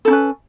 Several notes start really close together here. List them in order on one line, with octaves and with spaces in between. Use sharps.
A4 D#4 C#4 B4